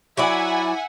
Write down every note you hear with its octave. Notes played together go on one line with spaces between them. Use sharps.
F#3 E4 D5 E5 F#5 G#5